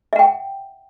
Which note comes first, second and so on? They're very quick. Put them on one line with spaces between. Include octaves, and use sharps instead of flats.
E5 F#5 G5